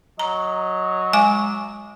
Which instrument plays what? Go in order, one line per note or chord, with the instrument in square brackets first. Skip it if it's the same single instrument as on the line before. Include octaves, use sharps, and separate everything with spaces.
[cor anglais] F#3 [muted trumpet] D#5 [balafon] A#5
[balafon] G#3 G#5 D6